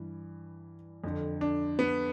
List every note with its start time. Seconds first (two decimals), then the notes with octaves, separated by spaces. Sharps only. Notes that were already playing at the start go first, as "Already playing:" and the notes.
Already playing: G2 E3
1.04 F2 D3
1.41 D4
1.79 B3